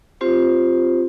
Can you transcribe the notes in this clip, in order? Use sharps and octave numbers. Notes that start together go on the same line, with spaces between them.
C4 F4 G4 C5